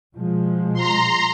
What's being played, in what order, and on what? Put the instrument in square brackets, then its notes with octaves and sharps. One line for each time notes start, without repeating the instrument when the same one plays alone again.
[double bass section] B2 F3 G#3
[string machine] A#5 C6